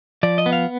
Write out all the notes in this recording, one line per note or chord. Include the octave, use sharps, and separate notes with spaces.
F3 D5
D#5
B3
F5